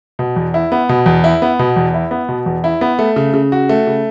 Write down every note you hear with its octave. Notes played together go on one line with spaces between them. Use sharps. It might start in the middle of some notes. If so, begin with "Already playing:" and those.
B2
E2
E4
B3
B2
E2
E4
B3
B2
E2
E4
B3
B2
E2
E4
B3
A3
C#3
C#3
F#4
A3
C#3